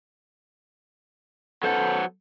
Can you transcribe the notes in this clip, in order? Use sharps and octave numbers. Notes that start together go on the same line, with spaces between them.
F#3 B3 C#4 A4 C5 F#5